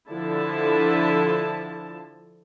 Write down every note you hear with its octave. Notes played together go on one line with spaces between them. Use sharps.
D3 F3 E4 A5